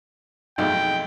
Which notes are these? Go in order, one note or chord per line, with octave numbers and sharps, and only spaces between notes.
B1 F2 G#3 A3 D#4 G5